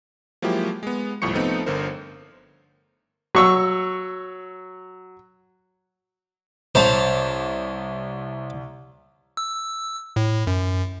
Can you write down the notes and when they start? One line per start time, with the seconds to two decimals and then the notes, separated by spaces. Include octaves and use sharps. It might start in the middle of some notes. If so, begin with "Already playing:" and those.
0.42 F3 F#3 G#3 A#3 E4 G4
0.83 G#3 B3
1.22 G1 C2 A2 F3 C#6 C#7
1.35 F3 A3 B3 C4 D#4 F4
1.66 G1 D3 A#4 C5
3.35 F#3 C#6 E6
6.75 C2 C5 C#5 A5 F7
9.37 E6
10.16 A2
10.47 F#2